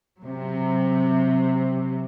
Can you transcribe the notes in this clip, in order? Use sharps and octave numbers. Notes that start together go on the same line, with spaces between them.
C3 F#3